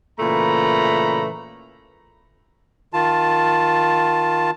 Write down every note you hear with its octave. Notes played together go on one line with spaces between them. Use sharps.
A#2 C#3 E3 A3 A#5 B5
D#3 F4 A5